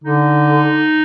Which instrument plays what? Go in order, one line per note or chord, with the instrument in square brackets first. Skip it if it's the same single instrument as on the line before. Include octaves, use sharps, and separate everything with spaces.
[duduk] D3 [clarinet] D#4